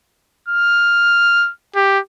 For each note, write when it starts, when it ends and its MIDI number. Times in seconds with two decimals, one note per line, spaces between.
0.49 1.51 89
1.76 1.99 67